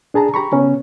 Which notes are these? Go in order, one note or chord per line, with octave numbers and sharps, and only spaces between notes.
D4 G#4 A5 A#5
G4 A#5 B5 C#6
C#3 B3 C#4